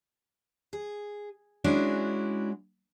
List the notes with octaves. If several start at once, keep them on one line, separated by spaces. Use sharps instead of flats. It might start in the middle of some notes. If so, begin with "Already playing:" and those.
G#4
G#3 C#4 D4 E4 F#4